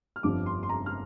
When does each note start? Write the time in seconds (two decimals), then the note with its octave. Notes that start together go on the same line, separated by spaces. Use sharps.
0.16 F6
0.23 G1 F2 D3 F3 D6
0.46 C6
0.63 C6
0.69 A#5
0.86 F6